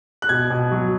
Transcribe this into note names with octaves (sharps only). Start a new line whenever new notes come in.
F#6
B2 G#6
B2
F#3